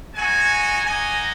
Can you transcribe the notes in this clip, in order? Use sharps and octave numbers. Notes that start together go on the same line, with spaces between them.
G#3 D#4 F#4 G#5
A#3 D#4 F#4 G#5